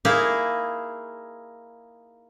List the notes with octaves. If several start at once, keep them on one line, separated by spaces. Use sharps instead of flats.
A#3 D#4 E4 G#4